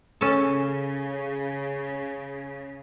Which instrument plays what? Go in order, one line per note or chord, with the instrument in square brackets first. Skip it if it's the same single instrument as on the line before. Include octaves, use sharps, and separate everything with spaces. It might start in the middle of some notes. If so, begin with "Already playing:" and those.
[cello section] C#3 [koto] C#4 A4